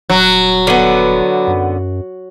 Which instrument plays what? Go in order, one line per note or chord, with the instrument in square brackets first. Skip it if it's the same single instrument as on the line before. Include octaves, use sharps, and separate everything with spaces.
[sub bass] D#1 [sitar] F#3
[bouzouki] D3 B3
[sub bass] F#2